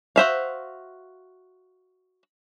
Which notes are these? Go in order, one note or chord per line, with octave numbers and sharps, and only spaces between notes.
F#4 C5 E5 F5